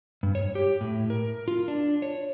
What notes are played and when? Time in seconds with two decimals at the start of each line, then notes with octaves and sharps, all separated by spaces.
0.23 G2
0.35 C#5
0.55 G4
0.81 A2
1.10 A#4
1.48 F4
1.68 D4
2.02 C#5